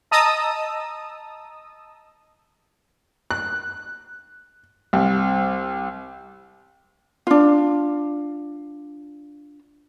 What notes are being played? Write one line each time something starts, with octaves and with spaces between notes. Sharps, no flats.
D#5 A5 A#5 D#6 E6
F#6
C2
D4 F4